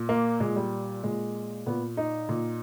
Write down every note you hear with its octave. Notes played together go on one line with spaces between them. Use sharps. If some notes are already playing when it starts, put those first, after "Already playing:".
Already playing: A#2
A#3
A#2 G#3
G3
A#2 G#3
A#2 B3
D#4
A#2